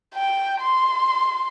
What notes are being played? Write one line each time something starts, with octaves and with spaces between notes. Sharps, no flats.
G5
C6